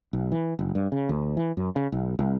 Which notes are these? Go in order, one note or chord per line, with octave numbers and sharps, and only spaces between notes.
B1
E3
F#1
G2
C#3
D2
E3
F#2
C#3
B1
C2